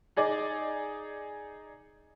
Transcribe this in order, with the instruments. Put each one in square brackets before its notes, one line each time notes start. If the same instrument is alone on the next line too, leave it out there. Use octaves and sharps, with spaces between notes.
[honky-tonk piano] D#4 G#4 D5 D#5